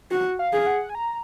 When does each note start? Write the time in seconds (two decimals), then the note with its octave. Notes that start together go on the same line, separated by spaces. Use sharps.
0.11 F#4
0.39 F5
0.53 G#4
0.67 F#5
0.89 G#5
0.95 A#5